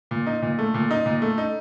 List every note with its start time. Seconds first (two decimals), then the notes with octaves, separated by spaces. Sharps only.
0.11 A#2
0.27 D#4
0.42 A#2
0.59 A3
0.74 A#2
0.91 D#4
1.06 A#2
1.22 A3
1.38 D#4